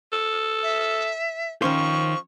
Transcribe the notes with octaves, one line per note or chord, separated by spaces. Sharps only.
A4
E5
D#3 F3 C#4 C5 C#6